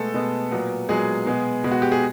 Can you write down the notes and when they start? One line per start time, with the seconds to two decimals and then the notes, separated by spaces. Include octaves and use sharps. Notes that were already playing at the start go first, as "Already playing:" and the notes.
Already playing: B2 G#3 A3 B3 A4
0.14 B2 G#3 B3
0.51 A#2 F#3 B3
0.89 A#2 F#3 G#3 B3 G#4
1.26 B2 G#3 B3
1.64 B2 G#3 B3
1.72 F#4
1.82 G4
1.92 G#4